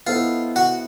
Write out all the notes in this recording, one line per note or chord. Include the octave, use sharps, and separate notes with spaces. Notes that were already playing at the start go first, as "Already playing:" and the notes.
B3 E4 F4 A4 C5 D#5
F#4